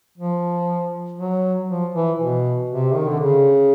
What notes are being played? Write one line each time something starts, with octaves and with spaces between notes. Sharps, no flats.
F3
F#3
F3
E3
B2
C3
D#3
D3
C#3